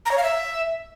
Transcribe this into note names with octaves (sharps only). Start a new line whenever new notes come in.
A#5
C#5
F5
E5